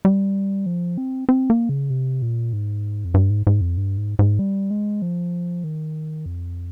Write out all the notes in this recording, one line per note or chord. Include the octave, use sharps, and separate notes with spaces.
G3
F3
C4
C4
A#3
C#3
C3
A#2
G#2
F2
G2
G#2
G#2
F2
G2
G#2
G#2
G3
G#3
F3
D#3
F2